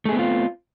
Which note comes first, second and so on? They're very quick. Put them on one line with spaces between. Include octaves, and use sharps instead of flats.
A3 G#4 B3 C4 F4